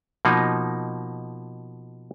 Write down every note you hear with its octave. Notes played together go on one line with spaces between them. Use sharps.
B2 F3 A#3 D#4